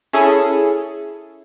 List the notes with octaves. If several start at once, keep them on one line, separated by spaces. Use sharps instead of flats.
C#4 E4 G#4 A4